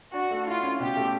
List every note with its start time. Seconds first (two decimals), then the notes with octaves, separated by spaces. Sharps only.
0.14 D4 F#4
0.31 A3
0.47 E4 F4
0.63 C#4
0.79 B2 G4
0.96 A3